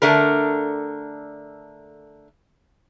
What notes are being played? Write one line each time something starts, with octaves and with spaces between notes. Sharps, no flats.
D3 A3 D4 A#4